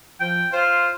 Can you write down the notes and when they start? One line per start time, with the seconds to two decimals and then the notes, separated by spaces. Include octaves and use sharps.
0.20 F3 G5
0.53 F4 C5